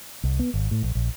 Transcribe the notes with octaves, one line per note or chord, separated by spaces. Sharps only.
C2
B3
G#1
A2
A#1
A#1